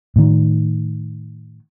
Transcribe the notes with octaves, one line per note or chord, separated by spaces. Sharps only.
A2 D#3